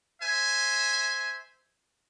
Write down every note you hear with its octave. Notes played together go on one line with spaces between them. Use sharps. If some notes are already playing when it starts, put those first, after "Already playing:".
C5 E5 G#5